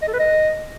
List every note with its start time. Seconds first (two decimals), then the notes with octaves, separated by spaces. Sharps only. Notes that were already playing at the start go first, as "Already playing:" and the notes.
0.02 D#5
0.08 A4
0.14 B4
0.19 D#5